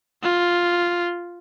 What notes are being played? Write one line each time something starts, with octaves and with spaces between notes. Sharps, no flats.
F4